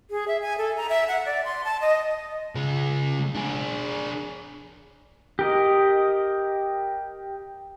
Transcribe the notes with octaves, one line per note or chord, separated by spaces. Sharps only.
G#4
E5
G#5
A4
A#5
E5
F#5
D5
C6
A5
D#5
C#3 G#3
D4 G#4
G4 A#4 D#5